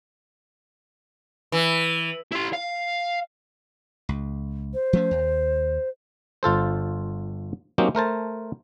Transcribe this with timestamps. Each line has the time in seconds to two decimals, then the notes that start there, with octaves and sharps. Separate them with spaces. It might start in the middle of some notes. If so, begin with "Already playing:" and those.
1.52 E3
2.32 E4 C6
2.53 F5
4.09 C#2
4.73 C5
4.93 F3 A3 C#4
5.11 D#2
6.43 G1 F4 A4 C5
7.78 F#3 A#3 C4 C#4 D#4 G4
7.95 A3 A#4 C5 A5